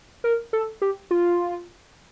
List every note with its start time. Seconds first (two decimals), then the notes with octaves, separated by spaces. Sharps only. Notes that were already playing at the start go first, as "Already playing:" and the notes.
0.24 A#4
0.53 A4
0.82 G4
1.11 F4